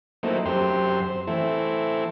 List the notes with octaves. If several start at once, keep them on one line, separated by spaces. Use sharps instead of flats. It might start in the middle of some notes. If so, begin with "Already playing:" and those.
F#3 A3 A#3 C4 D#4 E4
F#2 C4 G4 C6
C5
E3 A3 C4 E4